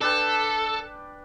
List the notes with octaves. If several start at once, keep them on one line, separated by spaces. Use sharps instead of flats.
D4 A4 B4 G5